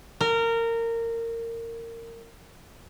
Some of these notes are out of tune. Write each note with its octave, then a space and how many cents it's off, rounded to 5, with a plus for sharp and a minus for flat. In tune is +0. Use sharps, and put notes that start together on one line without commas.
A#4 -20